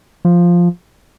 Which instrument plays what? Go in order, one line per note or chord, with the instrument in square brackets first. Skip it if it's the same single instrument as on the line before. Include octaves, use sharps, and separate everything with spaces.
[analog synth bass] F3